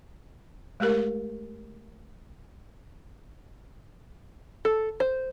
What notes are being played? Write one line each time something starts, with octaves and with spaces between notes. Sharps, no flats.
G#3 A3 G4 A#4
A4
C5